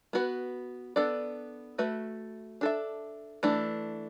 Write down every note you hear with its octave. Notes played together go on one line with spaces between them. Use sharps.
B3 F#4 B4
B3 D4 A4 D5
A3 F#4 B4 E5
D4 A4 E5
E3 A3 D4